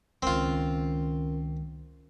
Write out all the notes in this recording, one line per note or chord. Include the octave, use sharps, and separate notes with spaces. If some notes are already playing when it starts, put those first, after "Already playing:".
C#2 D#3 C4 C#4 F4 A#4